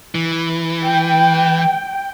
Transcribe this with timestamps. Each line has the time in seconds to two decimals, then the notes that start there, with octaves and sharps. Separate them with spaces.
0.15 E3
0.85 G5